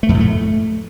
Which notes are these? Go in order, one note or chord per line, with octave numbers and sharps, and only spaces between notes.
A3
F2
A2
A3